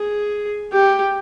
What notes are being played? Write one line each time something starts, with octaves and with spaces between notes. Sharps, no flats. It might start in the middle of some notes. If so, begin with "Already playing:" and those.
Already playing: G#4
G4